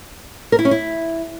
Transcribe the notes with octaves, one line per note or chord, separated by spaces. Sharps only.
A#4
E4
C#4
E4